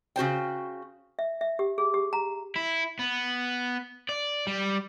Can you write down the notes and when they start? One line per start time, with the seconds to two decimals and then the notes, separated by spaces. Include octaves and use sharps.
0.16 C#3 F#4 C5 G5
1.19 E5
1.41 E5
1.59 G4
1.78 G#4
1.94 G4
2.13 A#5
2.56 E4
2.99 B3
4.09 D5
4.47 G3